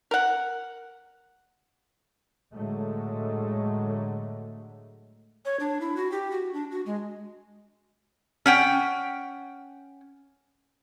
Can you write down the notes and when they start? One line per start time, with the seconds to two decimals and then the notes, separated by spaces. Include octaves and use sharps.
0.11 A#4 F#5
2.55 A2 D3 F#3 G#3 A3
5.45 C#5
5.60 D4
5.81 E4
5.96 F#4
6.11 G4
6.31 F#4
6.54 D4
6.71 F#4
6.86 G#3
8.46 C#4 F#5 G5